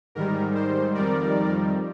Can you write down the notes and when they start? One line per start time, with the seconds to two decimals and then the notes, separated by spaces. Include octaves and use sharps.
0.15 G#2 D#3 G3 A#4
0.55 C5
0.94 F2 D#3 G3 A#4 D5